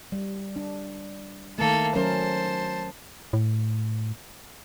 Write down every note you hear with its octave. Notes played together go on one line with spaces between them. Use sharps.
G3
D4
D#3 A3 A#3 A4
F#3 C#4 A#4 C5 A5
A2